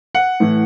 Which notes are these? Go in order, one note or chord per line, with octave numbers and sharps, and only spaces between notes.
F#5
A2 E3